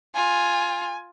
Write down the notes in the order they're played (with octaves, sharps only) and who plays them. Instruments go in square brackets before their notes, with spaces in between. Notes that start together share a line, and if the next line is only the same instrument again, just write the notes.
[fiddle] F4 [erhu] G#5